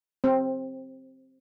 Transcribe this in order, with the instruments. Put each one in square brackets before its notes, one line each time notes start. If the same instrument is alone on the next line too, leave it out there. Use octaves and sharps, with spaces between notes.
[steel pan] C4